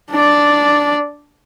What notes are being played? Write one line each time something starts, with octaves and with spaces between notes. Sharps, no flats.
D4 D5